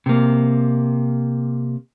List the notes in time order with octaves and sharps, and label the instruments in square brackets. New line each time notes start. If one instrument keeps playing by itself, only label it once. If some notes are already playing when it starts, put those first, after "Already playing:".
[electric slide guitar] C3 A#3